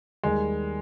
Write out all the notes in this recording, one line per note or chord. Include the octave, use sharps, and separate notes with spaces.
D#2 D#3 G3 G#3